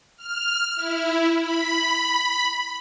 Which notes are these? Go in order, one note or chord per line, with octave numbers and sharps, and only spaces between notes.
F6
E4
B5